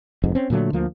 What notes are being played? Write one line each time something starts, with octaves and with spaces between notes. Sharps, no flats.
F1 F2 G#2
C4 C#4
A#2 D3 F#3 A3
D2 F3 A#3